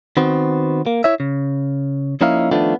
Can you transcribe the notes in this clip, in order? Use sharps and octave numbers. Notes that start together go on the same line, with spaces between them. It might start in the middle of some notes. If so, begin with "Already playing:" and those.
D#3 B3 C4 F#4
A#3
E4 C#5 E5
C#3
F3 A#3 C#4 D#4 E4 F5
D#3 F3 A3 B3 D4 F4